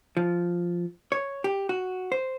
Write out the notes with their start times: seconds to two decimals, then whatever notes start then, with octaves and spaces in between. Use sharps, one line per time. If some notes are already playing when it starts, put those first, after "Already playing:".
0.17 F3
1.12 C#5
1.44 G4
1.69 F#4
2.12 C5